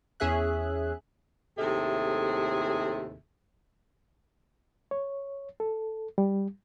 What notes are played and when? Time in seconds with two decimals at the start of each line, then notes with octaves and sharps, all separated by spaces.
0.20 E2 C#4 G#4 E5 F#6
1.58 D#2 A2 C3 G#4 A4 E5
4.91 C#5
5.60 A4
6.18 G3